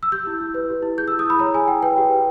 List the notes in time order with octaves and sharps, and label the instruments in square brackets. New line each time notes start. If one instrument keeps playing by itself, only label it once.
[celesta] E6
G4 G6
E4
E4
B4
G4
E4
G#4 G6
E6
E4
D#6
E4 B5
C#5 A#5
G#4 G#5
E4 G5
B4 G5
G4
B4